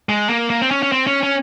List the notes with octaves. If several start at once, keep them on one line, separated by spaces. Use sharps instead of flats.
G#3
A#3
A#3
C4
C#4
C#4
C4
C#4
C#4